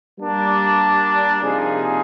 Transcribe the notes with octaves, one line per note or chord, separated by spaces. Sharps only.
G3 A#3 D4
C3 F3 A#3 D#4 G#4